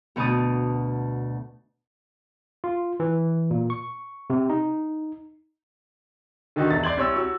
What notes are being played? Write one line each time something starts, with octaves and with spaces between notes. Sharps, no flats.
D2 B2 B4 A5 D#6
F4
E3
A#2
C#6
C3
D#4
D3 D#3 D#4 F#4
E1 E5 A6
D5 C6 G#6 F#7
C2 C#5 E6
F#4 E6